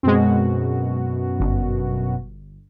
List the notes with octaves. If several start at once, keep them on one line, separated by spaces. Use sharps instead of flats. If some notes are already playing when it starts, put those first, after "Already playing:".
F#2 B2 G#3 C4 F#4
G1